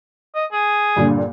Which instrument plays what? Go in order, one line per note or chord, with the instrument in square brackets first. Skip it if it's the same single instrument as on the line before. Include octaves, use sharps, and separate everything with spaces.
[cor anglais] D#5
G#4
[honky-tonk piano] G2 A#2 D3